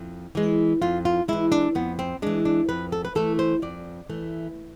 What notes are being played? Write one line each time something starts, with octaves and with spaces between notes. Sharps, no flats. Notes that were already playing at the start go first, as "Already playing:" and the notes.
Already playing: F2 E4
E3 G#3
F2 F4
F4
E3 G#3 E4
D4
F2 B3
C4
E3 G#3 D4
D4
F2 B4
A4
B4
E3 A3 A4
C5
F2 D5
E3 A3